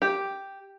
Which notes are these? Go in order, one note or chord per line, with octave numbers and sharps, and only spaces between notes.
G4